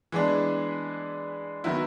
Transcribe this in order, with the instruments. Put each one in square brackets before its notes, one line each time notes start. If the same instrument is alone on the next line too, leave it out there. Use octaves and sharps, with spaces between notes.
[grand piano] E3 G#3 B3 D4
D#3 F#3 B3 E4